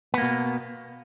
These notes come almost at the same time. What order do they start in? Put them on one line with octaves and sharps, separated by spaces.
B3 A#3 B2